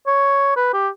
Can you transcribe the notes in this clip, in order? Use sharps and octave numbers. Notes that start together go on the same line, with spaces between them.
C#5
B4
G4